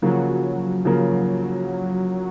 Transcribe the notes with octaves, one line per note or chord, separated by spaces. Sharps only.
C#3 F3 F#3 A#3
C#3 F3 A#3